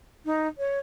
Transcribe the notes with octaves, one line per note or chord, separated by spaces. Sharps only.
D#4
C#5